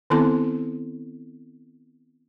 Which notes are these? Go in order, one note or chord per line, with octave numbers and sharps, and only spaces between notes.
D#3 B3 C4 E4 A4 C6